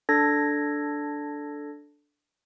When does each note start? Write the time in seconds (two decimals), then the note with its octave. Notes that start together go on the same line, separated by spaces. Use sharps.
0.09 D4 A4 G#6 A#6